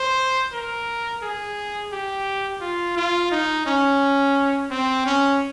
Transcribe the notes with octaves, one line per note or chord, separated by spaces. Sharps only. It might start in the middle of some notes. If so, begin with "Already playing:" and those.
Already playing: C5
A#4
G#4
G4
F4
F4
D#4
C#4
C4
C#4